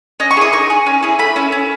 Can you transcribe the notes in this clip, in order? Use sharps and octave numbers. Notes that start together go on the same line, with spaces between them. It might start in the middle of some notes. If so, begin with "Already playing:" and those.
C#4 D#5
C#6
E4 G#4 D#6
D#4 C#6
G#4
C#4
E4 G#4
A3 B5
C#4 E4
C#4